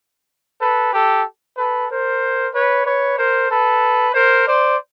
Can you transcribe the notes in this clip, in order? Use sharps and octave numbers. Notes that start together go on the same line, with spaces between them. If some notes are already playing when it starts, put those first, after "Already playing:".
A4 B4
G4 A4
A4 B4
A#4 C5
B4 C#5
B4 C#5
A#4 C5
A4 B4
A#4 C5
C5 D5